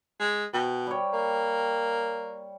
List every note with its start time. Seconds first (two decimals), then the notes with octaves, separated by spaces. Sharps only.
0.20 G#3
0.53 B2 G5
0.87 G3 C#5
1.13 A#3